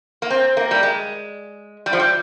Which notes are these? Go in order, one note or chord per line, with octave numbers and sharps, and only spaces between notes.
A#3
C4
A#3
G3
G#3
G3
F3
G3